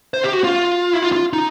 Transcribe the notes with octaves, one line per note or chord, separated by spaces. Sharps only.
C5
G4
F#4
F4
E4
F4
F4
D#4